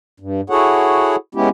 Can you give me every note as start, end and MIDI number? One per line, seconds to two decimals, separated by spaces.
0.20 0.41 43
0.50 1.16 64
0.50 1.16 66
0.50 1.16 68
0.50 1.16 69
0.50 1.16 73
0.50 1.16 78
1.35 1.49 56
1.35 1.49 59
1.35 1.49 61
1.35 1.49 64
1.35 1.49 67